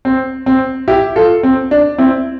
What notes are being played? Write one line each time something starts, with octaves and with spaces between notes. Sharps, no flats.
C4
C4
E4 G4
F4 A4
C4
D4
C4 E4